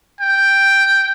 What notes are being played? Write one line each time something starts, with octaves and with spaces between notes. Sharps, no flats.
G5